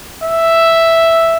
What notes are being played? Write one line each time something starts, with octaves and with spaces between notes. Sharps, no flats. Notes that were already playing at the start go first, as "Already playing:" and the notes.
E5